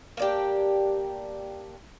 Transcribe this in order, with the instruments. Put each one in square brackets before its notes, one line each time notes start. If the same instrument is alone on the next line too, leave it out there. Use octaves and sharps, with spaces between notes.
[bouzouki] A#3 D4 G4